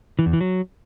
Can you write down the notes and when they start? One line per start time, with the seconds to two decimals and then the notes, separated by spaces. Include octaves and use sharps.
0.19 E3
0.26 E2
0.33 E3
0.41 F#3